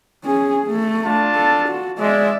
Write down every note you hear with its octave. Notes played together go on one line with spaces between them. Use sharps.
C#4 G#4
A3
D4 F4 A5
A4
F#4
G#3 D5 E5